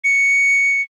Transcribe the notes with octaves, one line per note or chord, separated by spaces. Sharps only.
C#7